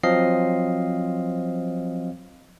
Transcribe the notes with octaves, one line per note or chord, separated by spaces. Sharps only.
F3 F#3 C4 D#5 F5 C7